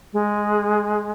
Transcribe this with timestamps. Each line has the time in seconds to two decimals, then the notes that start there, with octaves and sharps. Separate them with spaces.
0.13 G#3